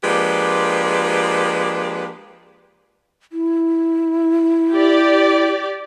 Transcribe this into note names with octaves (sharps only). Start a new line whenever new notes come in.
F3 G#3 A#3 D4 G4 B4
E4
G4 D5